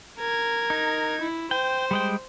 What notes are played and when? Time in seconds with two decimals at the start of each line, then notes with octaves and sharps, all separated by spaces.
0.19 A#4 G#6
0.70 D#4
1.21 E4
1.51 C5 G5
1.91 G3 G#3 G5